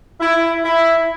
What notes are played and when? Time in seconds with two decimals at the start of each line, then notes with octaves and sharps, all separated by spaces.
0.20 E4
0.64 E4